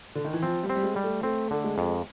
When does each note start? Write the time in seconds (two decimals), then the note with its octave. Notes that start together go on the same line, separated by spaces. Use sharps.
0.15 D3
0.25 D#3
0.33 E3
0.42 F3 C4
0.63 G3
0.70 C4
0.75 G3
0.83 G#3
0.96 G3
1.04 A3
1.23 A3 C4
1.51 D3 A3
1.64 G#3
1.78 F2